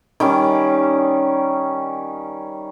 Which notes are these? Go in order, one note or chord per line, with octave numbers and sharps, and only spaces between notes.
D#3 G3 C#4